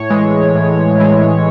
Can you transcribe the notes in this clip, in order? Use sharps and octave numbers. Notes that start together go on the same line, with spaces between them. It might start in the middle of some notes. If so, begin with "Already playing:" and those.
Already playing: A2 C#5
E3 G#3
A2
E3 G#3